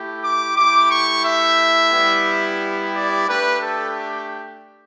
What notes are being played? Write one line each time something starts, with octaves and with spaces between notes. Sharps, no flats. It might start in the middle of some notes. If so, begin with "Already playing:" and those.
Already playing: A3 E4 G4
D6
A3 E4 G4 D6
C#6
E5
G3 B3 E4 G4
D5
A3 D4 G4 B4
A4